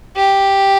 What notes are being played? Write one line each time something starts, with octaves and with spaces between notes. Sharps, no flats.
G4